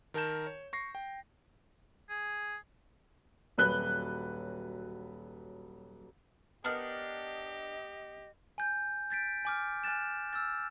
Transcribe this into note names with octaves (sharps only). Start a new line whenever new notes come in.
D#3 A#4 A5 G6 E7
C#5
C#6 A#6 C7
G5
G#4
D#1 F#3 B4 F#6 G7
B3 D4 D#4 G4 A#4 D#5 F6
G#5 G6
G6 A6 B6 D7
G#5 D6 F6
G#5 F6 F#6 A6 E7
E6 F6 A6